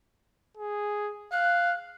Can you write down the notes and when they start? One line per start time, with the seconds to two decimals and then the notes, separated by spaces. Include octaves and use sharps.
0.57 G#4
1.32 F5 F#6